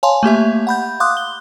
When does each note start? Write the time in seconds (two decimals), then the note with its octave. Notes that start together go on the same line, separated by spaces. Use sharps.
0.03 C#5 F5 G#5 A5 C6
0.23 A3 A#3 G4 E5
0.67 F#5 B5 G6
1.00 F5 C6 D6 D#6 F#6
1.17 G7